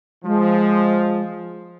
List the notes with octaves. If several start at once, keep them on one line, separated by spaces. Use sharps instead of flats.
F3 G#3